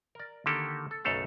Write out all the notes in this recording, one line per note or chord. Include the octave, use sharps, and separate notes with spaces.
A#4 D5
D3 D#3 A#3 G4 A4
A4
B1 F#2 C#3 A3 A4 F5